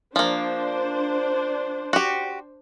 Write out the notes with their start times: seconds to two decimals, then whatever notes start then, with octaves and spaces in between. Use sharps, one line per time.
0.16 F3 A#3 D4 C5
1.93 F#4 G4